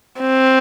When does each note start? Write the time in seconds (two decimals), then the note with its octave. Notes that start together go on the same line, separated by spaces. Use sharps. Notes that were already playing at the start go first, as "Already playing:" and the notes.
0.20 C4